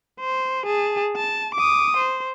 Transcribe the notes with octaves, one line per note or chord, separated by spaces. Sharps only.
C5
G#4 A5
A5
D6 D#6
C5